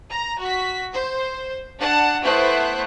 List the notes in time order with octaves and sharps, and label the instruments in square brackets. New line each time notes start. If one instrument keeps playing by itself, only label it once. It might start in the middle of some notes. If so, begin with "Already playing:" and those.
[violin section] A#5
F#4 B6
C5
D4 F#5 A5
A3 B3 E4 C5 F#6